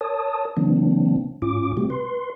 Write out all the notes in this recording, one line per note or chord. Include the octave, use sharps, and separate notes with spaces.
A#4 C#5 A5 D#6
C#3 E3 F#3 A#3 C4 D4
G#2 C#4 F4 D6
C3 G3 A3 C4 F#4 G4
B4 C6